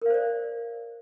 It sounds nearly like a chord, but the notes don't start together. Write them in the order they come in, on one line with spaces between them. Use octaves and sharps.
A#4 F5 C5 D5